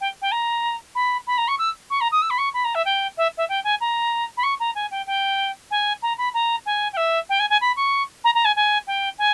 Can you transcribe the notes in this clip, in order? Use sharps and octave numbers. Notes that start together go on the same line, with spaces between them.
G5
G5
A#5
B5
B5
A#5
C#6
E6
C#6
A#5
D#6
E6
B5
C#6
B5
A#5
E5
G5
E5
E5
G5
G#5
A#5
B5
C#6
A#5
G#5
G5
G5
G#5
A#5
B5
A#5
G#5
G5
E5
G5
G#5
G#5
B5
C#6
A#5
A#5
G#5
G#5
G5
G#5